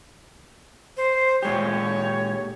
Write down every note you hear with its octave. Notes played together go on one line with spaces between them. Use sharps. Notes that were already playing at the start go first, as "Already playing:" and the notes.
C5
A#2 G#3 G4 C#5